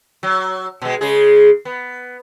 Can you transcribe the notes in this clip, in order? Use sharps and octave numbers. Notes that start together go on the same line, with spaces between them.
F#3
B2 G#3
C#3 G#3 G#4
B3